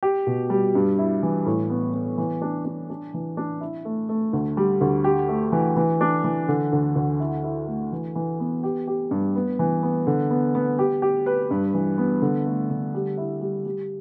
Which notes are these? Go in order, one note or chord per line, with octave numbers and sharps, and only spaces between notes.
G4
B2
G3
G2
E4
E3
A2
B3
B3
E3
D4
D4
D4
E3
D4
E4
A3
A3
D2
G3
D2
G4
A3
E3
E3
D4
E3
D3
D2
D2
E4
E4
A3
E3
E3
B3
G4
G4
G2
B3
E3
B3
D3
B3
B3
G4
G4
B4
G2
E3
B3
D3
A3
D3
G3
E4
G3
G3